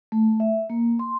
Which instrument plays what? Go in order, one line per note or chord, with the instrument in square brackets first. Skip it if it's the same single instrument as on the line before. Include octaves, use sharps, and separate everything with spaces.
[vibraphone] A3
E5
A#3
C6